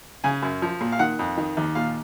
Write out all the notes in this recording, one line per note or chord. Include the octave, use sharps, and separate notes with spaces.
C#3 G#5
F#2
F3
A#2
F5
D#3 F#5
F2
D#3
D#2
A#2 F5